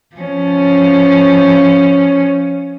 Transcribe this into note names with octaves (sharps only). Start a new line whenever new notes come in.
F3 C#4